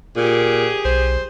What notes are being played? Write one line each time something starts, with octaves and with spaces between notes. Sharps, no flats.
A#2 G4 G#4
B1 C5